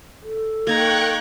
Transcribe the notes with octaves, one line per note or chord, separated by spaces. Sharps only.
A4
A#3 D#4 G5 A#5 C#6 F#6 G#6